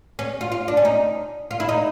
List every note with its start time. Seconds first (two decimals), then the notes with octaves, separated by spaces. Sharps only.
0.19 C#4
0.41 F4
0.52 F4
0.68 D4
0.77 C#4
0.85 D#4
1.51 F4
1.60 E4
1.69 D#4